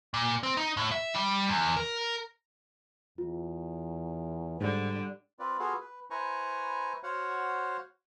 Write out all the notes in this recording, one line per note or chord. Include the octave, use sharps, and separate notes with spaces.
A#2
C4
D#4
A2
E5
G3
E2
A#4
E2 F4
G#2 D3 G3
C4 F4 B4 D5
B3 F4 F#4 G#4 A4 F5
B4
E4 B4 C5 G#5 A#5 C#6
F#4 C5 C#5 F5 F#5